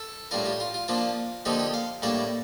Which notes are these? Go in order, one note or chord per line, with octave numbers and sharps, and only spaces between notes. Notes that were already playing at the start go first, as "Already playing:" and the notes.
Already playing: A4
A2 G3 D4 F4 A#4
G4
F4
F4
F3 A#3 D4 F4
D3 F3 A#3 D#4 G4
G4
F5
A2 G3 A#3 D4 D5